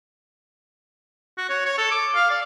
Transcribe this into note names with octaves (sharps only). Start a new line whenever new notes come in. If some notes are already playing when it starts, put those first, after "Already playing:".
F#4
C#5
C#5
A4
D6
F5
D5